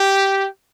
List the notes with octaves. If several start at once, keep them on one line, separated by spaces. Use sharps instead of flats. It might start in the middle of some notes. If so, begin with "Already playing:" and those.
Already playing: G4